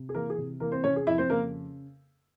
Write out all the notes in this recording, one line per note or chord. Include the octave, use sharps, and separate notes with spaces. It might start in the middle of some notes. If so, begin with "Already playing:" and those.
Already playing: C3
G#4
E3 A#3 A#4
G#4
C3
E3 A#3 A#4
C4 C5
C3 C#4 C#5
G#4
F2 E4 E5
C4 C5
C#3 A#3 A#4